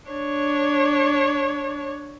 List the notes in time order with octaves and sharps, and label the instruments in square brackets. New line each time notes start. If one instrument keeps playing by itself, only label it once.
[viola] D4 C#5